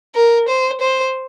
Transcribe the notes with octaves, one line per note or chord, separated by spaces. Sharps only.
A#4
C5
C5